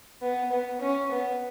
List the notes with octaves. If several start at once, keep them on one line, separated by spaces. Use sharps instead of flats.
B3
B3
C#4
B3